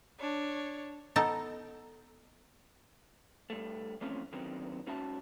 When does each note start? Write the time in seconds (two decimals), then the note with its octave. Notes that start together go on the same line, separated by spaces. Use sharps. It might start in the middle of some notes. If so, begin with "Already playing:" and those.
0.19 D4 C#5
1.16 B3 D#4 A4
3.50 G2 A3
4.01 E3 F3 A3 C4 C#4
4.33 D3 D#3 F#3 B3 C4
4.87 G#2 C#4 F#4 E5 A5